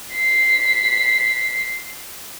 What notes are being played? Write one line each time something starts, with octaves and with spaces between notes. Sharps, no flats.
B6 C7